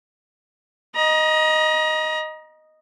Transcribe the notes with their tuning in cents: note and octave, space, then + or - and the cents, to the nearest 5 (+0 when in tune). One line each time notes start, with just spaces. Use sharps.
D#5 +0 A#5 +35